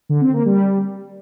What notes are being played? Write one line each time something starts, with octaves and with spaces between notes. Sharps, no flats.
D3
C4
A#3
G3